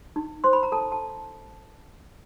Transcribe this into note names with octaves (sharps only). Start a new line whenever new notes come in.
D#4
C5 C6
B5
A#5
A4 A5
A5